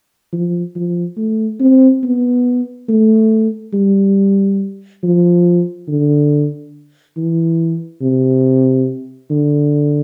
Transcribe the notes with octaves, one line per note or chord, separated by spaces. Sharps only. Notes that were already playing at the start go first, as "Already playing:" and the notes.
F3
F3
A3
C4
B3
A3
G3
F3
D3
E3
C3
D3